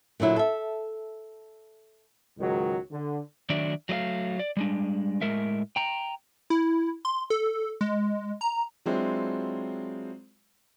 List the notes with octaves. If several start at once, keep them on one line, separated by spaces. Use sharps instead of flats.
A#2 D3 F#3 E4
A4 E5
C#2 G#2 D#3 F#3
D3
D#3 F#3 A3 D4 D5 E5
F#3 A3 D#5 F5
D5
G3 G#3 D4
A2 G#3 A#4 E5
G5 A#5
E4
C6
A4
G#3
A#5
F#3 G#3 C4 D4 E4 F4